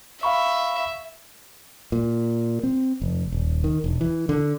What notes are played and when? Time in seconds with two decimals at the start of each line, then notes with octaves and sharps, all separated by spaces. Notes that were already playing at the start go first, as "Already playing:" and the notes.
0.23 E5 F5 B5 C#6
1.92 A#2
2.63 C4
3.02 F1
3.32 D#1
3.64 D#3
3.84 E1
4.01 E3
4.29 D3